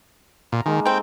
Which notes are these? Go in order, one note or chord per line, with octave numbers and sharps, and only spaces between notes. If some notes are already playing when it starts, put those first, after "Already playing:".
A#2 A#5
D#3 G#3 A#3 D#4
G3 C4 A4 G5